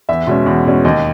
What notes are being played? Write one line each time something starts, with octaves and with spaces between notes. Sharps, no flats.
E2 E5
B2 G#3 C#4
E2
B2 G#3 C#4
D#2 D#5